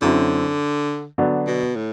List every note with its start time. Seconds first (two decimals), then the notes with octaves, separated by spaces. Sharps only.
0.02 F#2 D3 F#3 C4 E4
1.18 D3 F#3 B3 D4
1.47 B2
1.76 A2